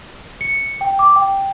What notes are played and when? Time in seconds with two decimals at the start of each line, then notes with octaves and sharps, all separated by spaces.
0.41 C#7
0.81 G5
0.99 D6
1.16 G5